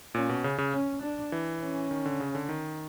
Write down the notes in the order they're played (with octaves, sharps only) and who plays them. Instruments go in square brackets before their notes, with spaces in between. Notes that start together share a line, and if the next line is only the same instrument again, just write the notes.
[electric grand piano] A#2 [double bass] C#4
[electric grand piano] B2
C#3
C#3
[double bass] C#4
D4
[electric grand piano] E3
[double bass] C#4
[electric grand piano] D#3
D3
C#3
D3
D#3